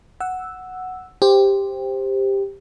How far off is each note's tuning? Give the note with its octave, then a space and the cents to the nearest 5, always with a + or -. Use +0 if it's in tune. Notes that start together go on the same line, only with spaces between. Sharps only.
F#5 +0 E6 +0
G4 +10 C5 +0